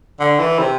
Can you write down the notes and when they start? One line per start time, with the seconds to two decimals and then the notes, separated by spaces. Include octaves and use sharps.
0.20 D3
0.39 E3
0.59 C3